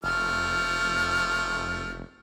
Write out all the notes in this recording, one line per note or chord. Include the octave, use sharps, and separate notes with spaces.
F1 F3 A3 F6